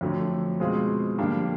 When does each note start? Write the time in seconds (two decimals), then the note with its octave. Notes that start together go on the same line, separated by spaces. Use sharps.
0.01 F2 D3 F#3 A3
0.60 B2 G#3 C4 F4 G#4
1.18 F2 D3 G3 A#3 D4